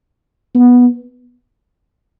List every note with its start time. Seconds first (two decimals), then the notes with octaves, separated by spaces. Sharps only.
0.55 B3